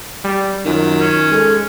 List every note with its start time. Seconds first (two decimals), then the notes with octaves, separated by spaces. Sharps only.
0.25 G3
0.65 F#2 D#3 F4
1.01 C#4
1.30 G#3 A4